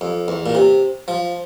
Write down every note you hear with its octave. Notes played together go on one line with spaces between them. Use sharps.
F2
E2
A#2
C3
F3